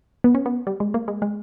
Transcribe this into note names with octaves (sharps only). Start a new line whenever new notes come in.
B3
C#4
B3
G3
G#3
A#3
G#3
G#3